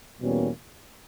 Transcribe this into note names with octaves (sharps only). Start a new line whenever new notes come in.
E2 B2 G3 A#3 C#4